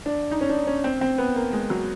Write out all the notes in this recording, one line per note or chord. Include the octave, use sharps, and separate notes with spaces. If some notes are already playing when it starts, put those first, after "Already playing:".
D4
D#4
C#4
D4
C#4
C4
C4
B3
A#3
G#3
F#3